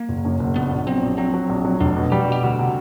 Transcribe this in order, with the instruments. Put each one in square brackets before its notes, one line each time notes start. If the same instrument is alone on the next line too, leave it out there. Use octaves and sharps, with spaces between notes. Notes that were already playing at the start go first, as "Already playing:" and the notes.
Already playing: [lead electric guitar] A#3
[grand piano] F#1
F#2
F#1
[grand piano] A#1 [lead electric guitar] B3
[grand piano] A#1
[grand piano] F#3 [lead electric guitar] C4
[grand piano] A#1
[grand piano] F#3 [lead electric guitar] C4
[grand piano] F#3
A#1
F#3
[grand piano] F1 [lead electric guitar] D4
[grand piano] B2
[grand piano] G3 [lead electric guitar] G4
[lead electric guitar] F#4
[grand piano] B2 [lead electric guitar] G4
[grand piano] D2 [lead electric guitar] F#4
[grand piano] C3